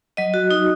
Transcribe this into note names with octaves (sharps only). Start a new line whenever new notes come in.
F#3 D#5
F#4
D#4